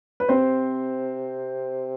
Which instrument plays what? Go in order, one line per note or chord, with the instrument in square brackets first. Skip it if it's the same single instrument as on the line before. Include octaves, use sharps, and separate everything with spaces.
[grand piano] B4
[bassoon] C3 [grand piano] C4 C5